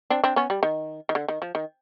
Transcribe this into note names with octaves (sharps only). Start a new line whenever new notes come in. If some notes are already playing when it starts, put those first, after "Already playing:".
C4 D4
C4 D4
B3 C#4
G3
D#3
D#3
D3
D#3
F3
D#3